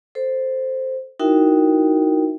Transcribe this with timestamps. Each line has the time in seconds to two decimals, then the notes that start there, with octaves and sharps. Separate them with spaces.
0.15 A4 C5
1.20 D#4 E4 F#4 A#4 E5 G5